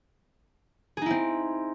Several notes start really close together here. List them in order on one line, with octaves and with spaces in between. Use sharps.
G#4 D#4 E4 C4